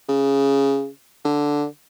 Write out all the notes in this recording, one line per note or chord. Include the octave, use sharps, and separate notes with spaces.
C#3
D3